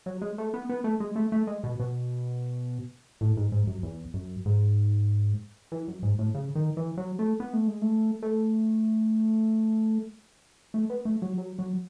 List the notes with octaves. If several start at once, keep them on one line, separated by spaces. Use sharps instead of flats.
F#3
G#3
A3
B3
B3
A3
G#3
A3
A3
G#3
B2
B2
A2
G#2
G#2
F#2
E2
F#2
G#2
E3
F#2
G#2
A2
C#3
D#3
E3
F#3
A3
B3
A3
G#3
A3
A3
A3
B3
A3
F#3
F#3
F#3